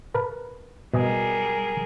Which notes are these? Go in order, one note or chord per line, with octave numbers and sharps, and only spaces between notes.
A#4 B4 A5
B2 G3 G#4 A#4 D#5 G#5